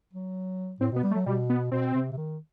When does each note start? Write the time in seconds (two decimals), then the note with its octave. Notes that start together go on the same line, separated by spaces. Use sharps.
0.13 F#3
0.80 A2 C4
0.92 B2 B3
1.03 G3
1.11 A3
1.15 F#3
1.26 B2 G3
1.50 B3
1.72 B2 C4
1.94 C3
2.12 C3
2.17 D#3